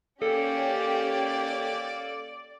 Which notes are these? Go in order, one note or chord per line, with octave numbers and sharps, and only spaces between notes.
A#3 C#4 G4 A4 D5